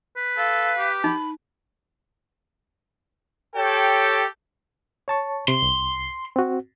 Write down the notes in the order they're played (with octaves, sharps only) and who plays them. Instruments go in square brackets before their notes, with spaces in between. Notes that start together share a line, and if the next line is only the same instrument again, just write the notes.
[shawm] B4
[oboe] A4 [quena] F5
[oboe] G4
[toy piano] D#4 [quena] B5
[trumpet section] G4 A4 C#5 G5
[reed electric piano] C#5 A5 C#6
[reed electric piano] C3 [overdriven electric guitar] C6
[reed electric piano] C2
C4 F#4